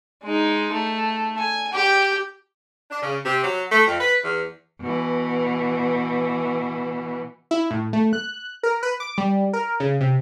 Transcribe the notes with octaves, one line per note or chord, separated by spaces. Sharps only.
G#3 D#4
A3
G#5
G4 G5
D4
C#3
C3
F#3
A3
F2
B4
E2
B2 E3
E4
A2
A3
F#6
A#4
B4
D6
G3
A#4
C#3
C3